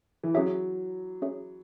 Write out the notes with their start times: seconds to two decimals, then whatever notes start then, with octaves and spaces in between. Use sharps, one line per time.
0.23 E3
0.34 F#3 C#4 G#4 C#5 E5
1.22 C#4 G#4 C#5 E5